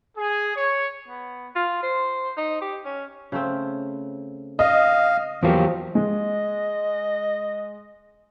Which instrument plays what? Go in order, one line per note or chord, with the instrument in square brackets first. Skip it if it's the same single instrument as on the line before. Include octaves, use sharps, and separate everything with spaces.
[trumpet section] G#4
C#5
[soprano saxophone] B3
F4
C5
D#4
G4
C#4
[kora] C#3 A3 C4
[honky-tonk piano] D#5 [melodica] F5
[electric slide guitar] E2 F#3 G4 [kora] F3 F4 [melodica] A#3
[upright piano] G#3 [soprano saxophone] D#5